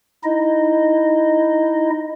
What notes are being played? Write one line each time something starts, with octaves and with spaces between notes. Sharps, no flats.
D#4 E4 D#5